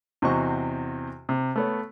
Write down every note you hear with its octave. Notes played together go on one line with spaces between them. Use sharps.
E2 C3 F#4 C5 D#5 C#6
C3
A3 B3 C#5